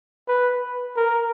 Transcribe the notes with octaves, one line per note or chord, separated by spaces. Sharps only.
B4
A#4